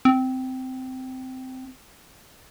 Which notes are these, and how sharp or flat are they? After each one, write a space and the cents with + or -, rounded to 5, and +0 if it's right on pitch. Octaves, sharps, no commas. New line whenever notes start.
C4 -15